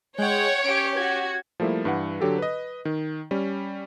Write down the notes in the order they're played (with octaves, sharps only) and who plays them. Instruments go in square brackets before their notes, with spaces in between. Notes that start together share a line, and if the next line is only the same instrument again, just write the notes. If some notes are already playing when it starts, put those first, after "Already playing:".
[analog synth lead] G#3 [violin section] C#5 [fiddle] F#5 G5
[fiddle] C#4 G4 [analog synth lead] D7
[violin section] F#4 [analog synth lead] G#6
[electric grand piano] F3 G3 A3 A#3 E4
G2 E3 F#5
D3 F#3 G4 A4
B4 D#5
D#3
G3 C#4